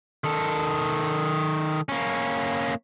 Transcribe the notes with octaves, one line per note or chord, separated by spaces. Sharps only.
D#3 A4
A#3 C#4